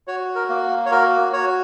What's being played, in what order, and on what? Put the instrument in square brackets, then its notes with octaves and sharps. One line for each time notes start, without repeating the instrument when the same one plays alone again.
[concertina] F#4 C#5
A#4
A#3
C#5
F#4 A#4
F#4 C#5